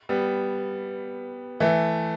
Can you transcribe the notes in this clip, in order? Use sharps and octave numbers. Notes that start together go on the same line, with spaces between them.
G3 B3
E3 A3